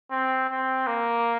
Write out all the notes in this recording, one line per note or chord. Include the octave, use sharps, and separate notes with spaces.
C4
C4
A#3